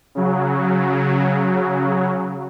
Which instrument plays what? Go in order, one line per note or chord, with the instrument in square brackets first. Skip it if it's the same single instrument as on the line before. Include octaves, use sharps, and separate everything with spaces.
[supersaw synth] C#3 F#3